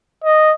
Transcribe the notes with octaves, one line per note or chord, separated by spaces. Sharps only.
D#5